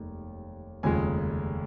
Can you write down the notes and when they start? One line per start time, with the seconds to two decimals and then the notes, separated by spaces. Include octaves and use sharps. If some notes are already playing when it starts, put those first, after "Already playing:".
Already playing: F1 D#2 D#3 G#3
0.83 F1 D#2 C#3 F3 G#3 G#5